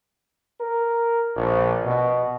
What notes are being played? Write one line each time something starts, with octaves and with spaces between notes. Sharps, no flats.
A#4
A#1
B2